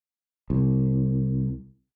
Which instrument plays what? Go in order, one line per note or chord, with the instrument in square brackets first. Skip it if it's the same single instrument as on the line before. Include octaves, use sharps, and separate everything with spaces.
[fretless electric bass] C2